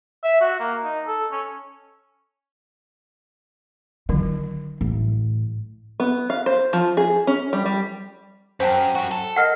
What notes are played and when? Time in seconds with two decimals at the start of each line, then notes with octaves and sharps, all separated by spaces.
0.24 E5
0.41 F#4
0.60 A#3
0.84 D#4
1.07 A4
1.32 C#4
4.09 D3 D#3 F#3
4.81 A1
6.00 B3
6.30 F5
6.46 C5
6.73 F3
6.97 G#4
7.27 C#4
7.53 G3
7.65 G3
8.60 F#2 C5 G5 A5
8.95 F#2 F#4
9.12 A4
9.36 A#4 D#5 F#5 F6 C7